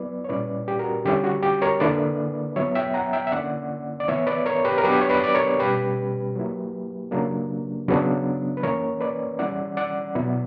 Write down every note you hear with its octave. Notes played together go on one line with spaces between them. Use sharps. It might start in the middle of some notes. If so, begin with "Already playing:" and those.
Already playing: F#3 B3 E4 B4 D5
C#5
A#2 G3 C#4 E4 B4 D5
G4
F#4 A#4
D3 G3 C#4 E4 G4
F#4
G4
A#4 C#5
D3 A#3 E4 B4 D5
F#3 B3 E4 C#5 E5
E5 G5
F#5 A#5
E5 G5
E5
D3 A#3 C#4 E4 D5 F#5
D5
E3 B3 E4 C#5 E5
B4 D5
A#4 C#5
G4 B4
A#4
F#3 B3 D4 G4 B4
C#5
B4 D5
D5
A#4 C#5
B2 G3 C#4 G4 B4
F#3 A#3 E4
C#3 F#3 A#3 D4
C#3 F#3 B3 D4
B4
E3 A#3 C#4 A#4 C#5
B4 D5
E3 G3 C#4 E4 D5 F#5
D5 F#5
B2 F#3 B3 E4